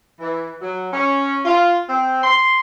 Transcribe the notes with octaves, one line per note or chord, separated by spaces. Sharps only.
E3
F#3
C#4
F4
C4
C6